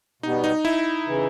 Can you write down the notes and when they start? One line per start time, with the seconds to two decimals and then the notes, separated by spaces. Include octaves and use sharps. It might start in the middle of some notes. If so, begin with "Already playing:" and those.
0.22 B2 G3 B3 D#4
0.44 D#4
0.65 E4
1.07 C#3 E3